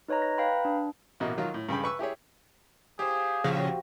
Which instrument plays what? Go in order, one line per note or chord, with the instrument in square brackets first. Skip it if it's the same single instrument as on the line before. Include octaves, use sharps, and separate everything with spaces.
[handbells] D#4 B4 C#5 D#5 A#5
A#6
B4 F5 G5 A#5 B5
D4
[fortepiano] A1 B2 A#3 D#5
D#3 F#3 F4
A2
G2 C#3 G5 B5
B4 C#6 E6
E4 G4 G#4 C#5
[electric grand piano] G4 C5 [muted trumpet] G#4 [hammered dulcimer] F5
[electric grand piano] A#1 F3 A#6 [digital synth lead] C#3 [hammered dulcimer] F#4 G4 C5